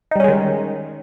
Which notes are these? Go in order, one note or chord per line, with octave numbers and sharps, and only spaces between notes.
D#3 G3 G#3 C#4 D#4